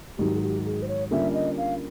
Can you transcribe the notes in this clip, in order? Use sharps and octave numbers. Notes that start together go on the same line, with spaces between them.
G#2 D#3 F#3 G4
G#4
G4
G#4
C5
C#5
D3 G3 A#3 C#4 F4 E5
D#5
F5